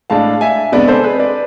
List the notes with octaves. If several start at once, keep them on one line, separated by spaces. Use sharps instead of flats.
A2 G#3 D4 F5 A5
E5 G#5
C3 G#3 B3 D4 B4 D5
A4 C5
G#4 B4
B4 D5